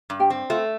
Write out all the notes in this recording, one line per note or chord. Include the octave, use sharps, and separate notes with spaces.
G2
G4 G5
C4
A3 F4 F5